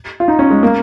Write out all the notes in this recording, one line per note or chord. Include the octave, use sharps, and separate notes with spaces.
F4
D#4
C#4
G#3
A#3